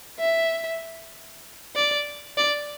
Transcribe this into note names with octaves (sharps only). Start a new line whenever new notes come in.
E5
D5
D5